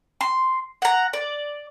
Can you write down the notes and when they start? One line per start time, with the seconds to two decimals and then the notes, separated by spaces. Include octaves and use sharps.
0.21 C6
0.82 F#5 A#5
1.13 D5